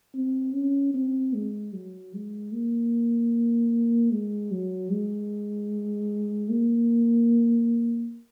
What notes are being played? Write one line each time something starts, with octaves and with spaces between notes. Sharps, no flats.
C4
C#4
C4
G#3
F#3
G#3
A#3
G#3
F#3
G#3
A#3